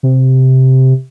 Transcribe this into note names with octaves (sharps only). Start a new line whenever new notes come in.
C3